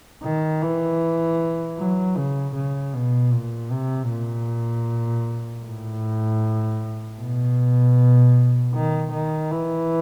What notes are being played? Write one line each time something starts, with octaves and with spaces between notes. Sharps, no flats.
D#3
E3
F#3
C#3
C#3
B2
A#2
C3
A#2
A2
B2
D#3
D#3
E3